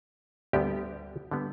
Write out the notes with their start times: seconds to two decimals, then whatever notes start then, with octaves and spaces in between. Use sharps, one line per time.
0.53 D2 D3 G3 B3 G4
1.31 D3 G3 B3